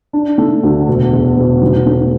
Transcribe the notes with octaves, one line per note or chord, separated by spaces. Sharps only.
D4
A3
D2
E1
E2
E1
F#3
A3